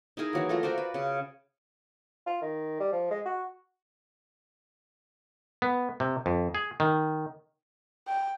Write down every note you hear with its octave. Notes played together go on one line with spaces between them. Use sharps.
D#4 E4 G#4 A#4
E3 F#3 A#3
A3 F4 A#4
F#4 A#4 C5 D5
B4
C#3
F4
D#3
G3
F3
G#3
F#4
B3
C3
F2
G#4
D#3
G5